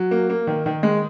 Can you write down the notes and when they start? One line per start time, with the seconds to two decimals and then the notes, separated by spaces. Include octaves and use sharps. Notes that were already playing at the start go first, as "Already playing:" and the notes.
Already playing: F#3
0.11 A#3
0.30 A#3
0.47 D#3
0.66 D#3
0.83 G#3